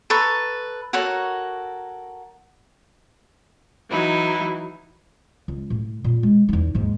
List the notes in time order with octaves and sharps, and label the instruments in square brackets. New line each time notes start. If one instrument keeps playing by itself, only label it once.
[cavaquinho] A4 B4 A#5 C#6
F#4 A4 A#4 C#5
[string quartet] E3 F#3 D#4 E4
[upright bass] C#2
A2
A#2
G#3
E2 D#4
D#2 G#2